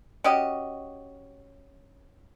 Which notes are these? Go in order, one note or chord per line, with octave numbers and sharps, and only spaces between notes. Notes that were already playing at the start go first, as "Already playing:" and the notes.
C#4 F#4 G4 D#5